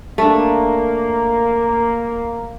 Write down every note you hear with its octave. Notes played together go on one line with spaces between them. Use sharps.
A3 A#3 D4